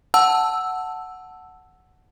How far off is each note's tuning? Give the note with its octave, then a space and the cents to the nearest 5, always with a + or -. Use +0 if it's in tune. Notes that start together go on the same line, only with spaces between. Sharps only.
F#5 +0 A5 +0 E6 +0